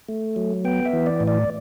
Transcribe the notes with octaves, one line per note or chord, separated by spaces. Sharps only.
A3
F#3
B3 G5
E5
E3
D5
A2
D5